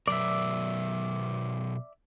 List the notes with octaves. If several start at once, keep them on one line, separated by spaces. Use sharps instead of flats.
B2 F#3 A#4 D5 E5